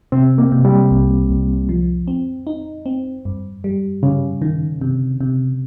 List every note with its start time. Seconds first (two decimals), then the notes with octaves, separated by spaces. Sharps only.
0.12 C3 C4
0.38 A#3
0.52 C3
0.65 G3
0.91 C2
1.30 C2
1.69 F3
2.08 C4
2.47 D#4
2.86 C4
3.25 G2
3.64 G3
4.03 G2 C#3
4.42 D#3
4.81 C3
5.21 C3